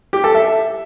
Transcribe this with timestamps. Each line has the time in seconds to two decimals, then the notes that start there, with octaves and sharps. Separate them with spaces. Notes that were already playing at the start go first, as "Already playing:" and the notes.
0.13 G4
0.24 A4
0.35 E5